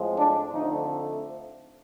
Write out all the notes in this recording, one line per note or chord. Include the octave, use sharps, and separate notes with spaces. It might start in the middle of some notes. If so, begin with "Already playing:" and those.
Already playing: A2 F3 G#3 C4
D4
D3 F3 A3 C4 D#4